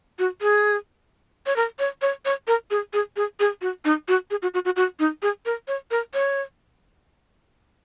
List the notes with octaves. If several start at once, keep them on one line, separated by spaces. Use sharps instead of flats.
F#4
G#4
C#5
A#4
C#5
C#5
C#5
A#4
G#4
G#4
G#4
G#4
F#4
D#4
F#4
G#4
F#4
F#4
F#4
F#4
D#4
G#4
A#4
C#5
A#4
C#5